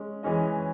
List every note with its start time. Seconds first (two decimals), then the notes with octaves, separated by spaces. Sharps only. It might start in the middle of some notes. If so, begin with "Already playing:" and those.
Already playing: G#3 C#4
0.23 E3 G#3 C#4 G#4 D#5